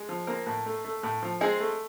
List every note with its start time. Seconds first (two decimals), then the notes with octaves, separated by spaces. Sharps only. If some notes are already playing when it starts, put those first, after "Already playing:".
Already playing: G#3
0.09 F3
0.27 A#3 C4 A#4
0.46 A2
0.66 A3
0.85 A3
1.03 A2
1.22 F3
1.41 G#3 C4 G#4
1.60 A3